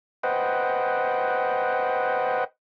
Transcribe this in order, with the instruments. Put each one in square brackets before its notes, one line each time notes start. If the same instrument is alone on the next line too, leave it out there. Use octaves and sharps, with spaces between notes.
[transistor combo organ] B4 C5 D#5 F#5 G5